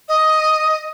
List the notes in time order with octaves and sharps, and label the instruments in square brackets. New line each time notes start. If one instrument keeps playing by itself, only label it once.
[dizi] D#5